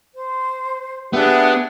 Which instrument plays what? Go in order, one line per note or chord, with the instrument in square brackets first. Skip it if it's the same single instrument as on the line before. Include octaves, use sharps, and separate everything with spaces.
[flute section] C5
[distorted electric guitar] B3 [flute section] D4 G4 G#4 [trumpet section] E5 F#5